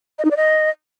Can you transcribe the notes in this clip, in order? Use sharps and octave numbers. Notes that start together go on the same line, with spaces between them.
D#5
D#4
D5
D#5